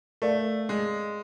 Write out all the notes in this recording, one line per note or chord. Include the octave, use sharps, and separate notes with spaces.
A3 A#4 D5 F5
G#3